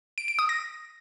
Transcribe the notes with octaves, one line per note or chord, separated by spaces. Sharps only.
D7
D7
D#6
A#6